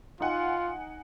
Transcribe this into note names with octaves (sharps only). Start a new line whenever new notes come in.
D#4 F4 F#5 G#5